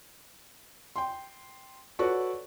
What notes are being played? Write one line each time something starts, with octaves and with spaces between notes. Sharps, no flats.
G5 C6
F#4 A4 B4 C#5 D5 C#6